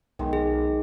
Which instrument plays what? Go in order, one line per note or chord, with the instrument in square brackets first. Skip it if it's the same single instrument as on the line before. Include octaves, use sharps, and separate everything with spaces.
[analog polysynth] B1 [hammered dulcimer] D#3 G#3
[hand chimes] G#4